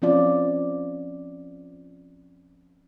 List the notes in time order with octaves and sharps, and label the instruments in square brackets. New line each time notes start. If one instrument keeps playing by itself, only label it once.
[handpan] F3 C4 C#4 F4 D5